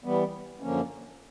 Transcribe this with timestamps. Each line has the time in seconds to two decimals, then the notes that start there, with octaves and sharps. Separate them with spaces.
0.04 E3 G3 B3
0.60 F#2 D3 F3 A#3 C#4